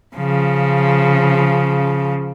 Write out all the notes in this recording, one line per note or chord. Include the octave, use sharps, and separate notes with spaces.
C#3 F3